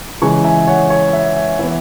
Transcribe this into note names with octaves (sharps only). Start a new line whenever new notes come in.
C#3 E3 G#3 G#5 C#6
E5 G#5
C#5 F#5
C#5
E5
E5
E3 B3 E5